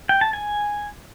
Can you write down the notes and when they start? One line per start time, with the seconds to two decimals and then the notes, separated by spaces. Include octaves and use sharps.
0.09 G5
0.21 A5
0.33 G#5